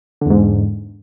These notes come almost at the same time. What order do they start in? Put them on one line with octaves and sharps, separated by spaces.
D3 E2 G#2